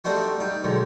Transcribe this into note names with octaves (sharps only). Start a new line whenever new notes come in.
G3 A3 C4 D4 D#4 F#4
G3 D#4
B1 G#2 D3